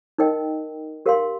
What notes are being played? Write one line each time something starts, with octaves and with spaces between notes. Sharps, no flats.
D#4 A#4 D#5 G5
G4 A#4 F5 C6